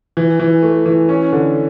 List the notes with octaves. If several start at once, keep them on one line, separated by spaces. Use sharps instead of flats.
E3
E3
A3
E3
C#4
D3